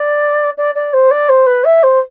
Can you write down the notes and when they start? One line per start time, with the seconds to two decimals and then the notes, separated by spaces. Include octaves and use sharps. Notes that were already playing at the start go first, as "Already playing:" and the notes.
Already playing: D5
0.57 D5
0.75 D5
0.93 C5
1.11 D5
1.29 C5
1.46 B4
1.64 E5
1.83 C5